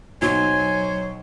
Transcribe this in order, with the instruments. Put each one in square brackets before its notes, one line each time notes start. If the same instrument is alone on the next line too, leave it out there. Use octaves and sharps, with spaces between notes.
[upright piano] B1 [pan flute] F#3 [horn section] C5 C#5 [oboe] G#5